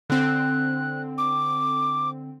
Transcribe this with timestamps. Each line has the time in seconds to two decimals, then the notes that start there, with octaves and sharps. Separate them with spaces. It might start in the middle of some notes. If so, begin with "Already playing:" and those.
0.10 D3 C4 F#6
1.18 D6